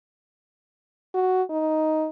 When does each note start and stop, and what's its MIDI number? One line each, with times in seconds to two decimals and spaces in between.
1.14 1.43 66
1.50 2.09 63